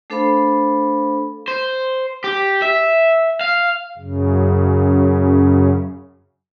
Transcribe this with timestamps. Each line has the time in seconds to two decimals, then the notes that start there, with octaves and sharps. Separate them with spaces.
0.10 A3 D4 A4 C5 F5 B5
1.48 C5
2.24 G4
2.62 E5
3.41 F5
3.98 F#2 C#3